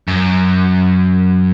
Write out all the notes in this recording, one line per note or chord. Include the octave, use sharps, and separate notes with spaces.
F#2